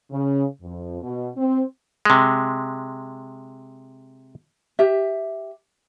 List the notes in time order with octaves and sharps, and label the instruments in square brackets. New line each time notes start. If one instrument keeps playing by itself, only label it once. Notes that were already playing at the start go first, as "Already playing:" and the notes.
[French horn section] C#3
F2
B2
C4
[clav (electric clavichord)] C3 G#3
[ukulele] G4 E5